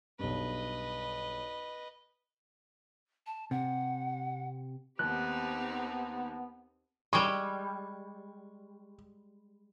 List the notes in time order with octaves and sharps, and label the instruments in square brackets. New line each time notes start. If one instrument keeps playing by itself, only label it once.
[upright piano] B1 G2 [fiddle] B4 D#5
[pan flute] A5
[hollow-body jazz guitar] C3 [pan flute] F#5
[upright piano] D#2 [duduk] B3 [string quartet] C4 D#4 G4 [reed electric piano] F#6
[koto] G3 G#3 [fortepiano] C#6